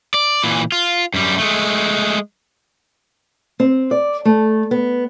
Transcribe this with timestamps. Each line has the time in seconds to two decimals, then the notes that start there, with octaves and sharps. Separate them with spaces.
0.14 D5
0.44 A#2 E3
0.72 F4
1.14 F#2 G3
1.38 G#3 A3
3.60 C4
3.91 D5
4.25 A3
4.71 B3